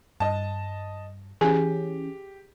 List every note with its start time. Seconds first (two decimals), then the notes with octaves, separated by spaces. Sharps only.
0.20 G2 D#5 A5
1.41 E3 C#4 G4 G#4 G#5